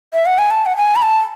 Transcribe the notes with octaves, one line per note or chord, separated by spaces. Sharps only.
E5
F#5
G#5
A5
F#5
G#5
B5
A5